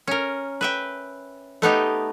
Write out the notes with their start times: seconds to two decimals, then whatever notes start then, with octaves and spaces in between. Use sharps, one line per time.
0.07 C#4 A#4
0.61 B4 E5 G5
1.62 A3 B3 D#4 G4